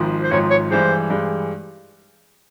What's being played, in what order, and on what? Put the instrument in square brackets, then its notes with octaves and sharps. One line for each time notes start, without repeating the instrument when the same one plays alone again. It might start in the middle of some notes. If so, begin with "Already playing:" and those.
Already playing: [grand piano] G#1 G#2 F3
[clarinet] C5
[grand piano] G#1 G#2 F3 [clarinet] C#5
[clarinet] C#5
[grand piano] G2 E3 G#3 [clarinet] C5
[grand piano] G2 E3 G#3